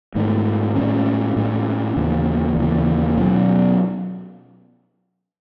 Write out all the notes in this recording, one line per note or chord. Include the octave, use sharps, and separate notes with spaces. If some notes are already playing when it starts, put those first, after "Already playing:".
G#2 D#3 A3
A2 G#3 C#4
A2 G#3 C#4
D#2 C#3 E3
D#2 C#3 E3
B2 F#3 C#4